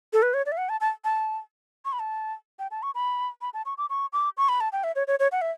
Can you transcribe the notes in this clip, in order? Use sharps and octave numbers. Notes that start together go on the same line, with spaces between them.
A4
B4
C#5
D5
E5
F#5
A5
A5
A5
C#6
B5
A5
G5
A5
C#6
B5
B5
A5
C#6
D6
C#6
D6
C#6
B5
A5
G5
E5
C#5
C#5
C#5
F#5
E5